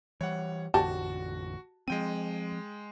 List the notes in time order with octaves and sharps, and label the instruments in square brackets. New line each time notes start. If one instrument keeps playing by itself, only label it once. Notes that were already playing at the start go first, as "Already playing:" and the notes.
[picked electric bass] E3 G3 [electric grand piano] C#5 F#5
[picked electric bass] A1 F2 D3 [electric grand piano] F#4 [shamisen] G4 [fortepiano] A5
[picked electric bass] F3 C4 [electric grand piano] G#3 G5 D#7